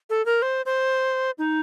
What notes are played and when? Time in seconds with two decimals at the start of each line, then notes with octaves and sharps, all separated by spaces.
0.10 A4
0.26 A#4
0.42 C5
0.66 C5
1.38 D#4